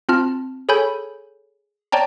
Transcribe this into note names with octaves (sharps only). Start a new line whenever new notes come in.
C4 F4 A5 F6
G#4 A4 C#5 G#5 B5 G6
C#5 D5 G5 A5 A#5